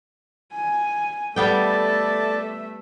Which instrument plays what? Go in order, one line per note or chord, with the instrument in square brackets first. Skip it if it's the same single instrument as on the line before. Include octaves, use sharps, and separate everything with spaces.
[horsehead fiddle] G#5
[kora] G3 B3 G5 [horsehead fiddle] A3 E5 [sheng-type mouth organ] A4 D5